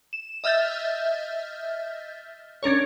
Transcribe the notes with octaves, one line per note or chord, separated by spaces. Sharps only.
E7
D#5 E5 F6 G6 A6
C#4 D4 A#4 C#5